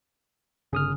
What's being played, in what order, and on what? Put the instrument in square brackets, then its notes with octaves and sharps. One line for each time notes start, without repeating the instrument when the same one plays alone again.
[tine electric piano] G1 D#6 F6 [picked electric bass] C#3